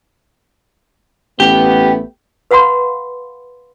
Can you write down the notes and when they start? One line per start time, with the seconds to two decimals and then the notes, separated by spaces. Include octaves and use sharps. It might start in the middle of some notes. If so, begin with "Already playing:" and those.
1.40 A1 A3 B3 G4
2.51 B4 F5 F#5 B5 C6